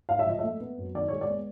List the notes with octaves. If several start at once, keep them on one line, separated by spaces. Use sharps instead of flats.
G#2 F5
E5
F3 D#5
A3 E5
B3
F#2
D#3 D5
G#3 C#5
D5
B3